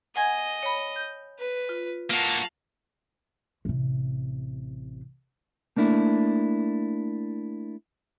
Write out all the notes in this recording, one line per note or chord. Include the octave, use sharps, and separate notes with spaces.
D#5 F#5 G#5 G#6
C#5 B5
G6
B4
F4
A#3 F#4 F5 A5
A1 C3
A3 A#3 D4 E4